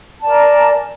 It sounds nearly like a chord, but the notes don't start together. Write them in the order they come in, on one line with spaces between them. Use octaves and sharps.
A5 D5 A#4 G#5